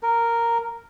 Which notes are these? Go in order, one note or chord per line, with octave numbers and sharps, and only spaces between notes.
A#4